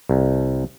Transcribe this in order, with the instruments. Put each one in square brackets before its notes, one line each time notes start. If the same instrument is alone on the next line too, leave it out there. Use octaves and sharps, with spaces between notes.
[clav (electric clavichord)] C2